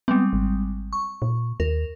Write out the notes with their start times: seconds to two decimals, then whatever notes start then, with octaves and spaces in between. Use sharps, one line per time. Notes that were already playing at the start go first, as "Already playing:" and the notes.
0.08 G3 G#3 B3 C4
0.33 G#1
0.93 C#6
1.22 A#2
1.60 D#2 A#4